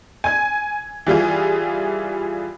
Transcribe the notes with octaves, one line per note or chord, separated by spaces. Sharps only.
G#5 G#6
E3 G3 F4 G#4